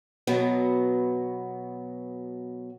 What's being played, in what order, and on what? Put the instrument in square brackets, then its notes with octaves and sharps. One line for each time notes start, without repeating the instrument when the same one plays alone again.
[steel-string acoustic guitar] B2 F#3 B3